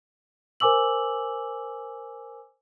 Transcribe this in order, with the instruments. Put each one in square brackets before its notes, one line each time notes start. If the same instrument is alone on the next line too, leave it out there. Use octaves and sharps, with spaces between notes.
[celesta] A#4 C5 G#5 D6 E6 F#7